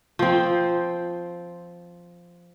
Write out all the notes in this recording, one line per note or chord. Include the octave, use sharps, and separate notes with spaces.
F3 C4